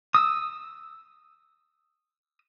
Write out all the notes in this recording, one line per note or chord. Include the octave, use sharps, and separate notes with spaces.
D#6 E6